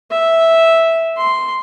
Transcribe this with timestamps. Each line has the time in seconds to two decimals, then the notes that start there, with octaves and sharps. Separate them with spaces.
0.11 E5
1.17 C6